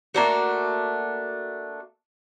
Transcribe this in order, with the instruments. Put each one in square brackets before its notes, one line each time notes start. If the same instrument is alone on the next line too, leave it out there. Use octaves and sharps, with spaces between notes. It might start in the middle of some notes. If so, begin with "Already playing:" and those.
[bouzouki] A3 A#3 D4 F#4